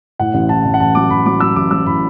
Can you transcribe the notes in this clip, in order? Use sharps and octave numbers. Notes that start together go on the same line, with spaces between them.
A2 F#5
A1
A2 A5
A1
F#5
A1 A5
F#3 D6
A1 B5
F#3 D6
F#3 E6
A1 D6
F#3 E6
A2 B5